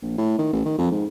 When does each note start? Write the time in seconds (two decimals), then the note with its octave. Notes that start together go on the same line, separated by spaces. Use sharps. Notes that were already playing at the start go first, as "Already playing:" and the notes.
0.02 A#1
0.18 A2
0.38 D#3
0.53 A1
0.65 D#3
0.79 F2
0.91 G#2